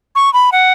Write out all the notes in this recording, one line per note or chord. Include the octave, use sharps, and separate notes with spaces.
C#6
B5
F#5